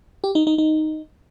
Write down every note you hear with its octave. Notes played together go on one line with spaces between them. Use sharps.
G4
D#4
D#4
D#4